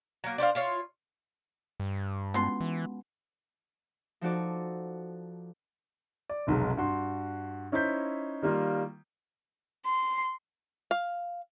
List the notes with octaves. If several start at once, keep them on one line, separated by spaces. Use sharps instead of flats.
F#3 A#3
D4 C5 C#5 F5
E4 F4 C#5
G2
B2 G#3 B3 C#4 C6
E3
F3 D#4 F#4 A4 D5
D5
F1 B1 F#3 G#3
G2 F#4 C6
C#4 D#4 E4 C5 G6 B6
D#3 G3 A#3 F4
C6
F5